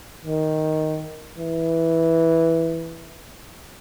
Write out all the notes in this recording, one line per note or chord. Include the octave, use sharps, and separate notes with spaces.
D#3
E3